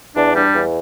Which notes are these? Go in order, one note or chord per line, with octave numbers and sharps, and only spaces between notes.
E2 D4
G3 D4
E2